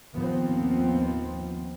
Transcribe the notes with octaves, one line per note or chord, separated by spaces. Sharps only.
D#2 F3 B3 C4